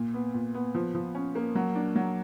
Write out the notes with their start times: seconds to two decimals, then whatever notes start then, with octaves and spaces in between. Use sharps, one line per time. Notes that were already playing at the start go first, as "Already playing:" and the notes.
Already playing: A#2
0.14 B3
0.34 A#2
0.54 B3
0.75 F3
0.94 F3
1.15 C#4
1.35 A#3
1.55 F#3
1.75 D4
1.96 F#3